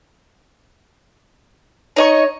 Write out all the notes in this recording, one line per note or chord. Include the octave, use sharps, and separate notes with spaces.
D#4 C#5 D#5 C#6